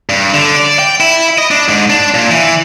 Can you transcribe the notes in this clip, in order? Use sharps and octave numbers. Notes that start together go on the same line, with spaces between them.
G2
D3
D5
G5
E4
D#5
D4
G#2
D4
A#2
E3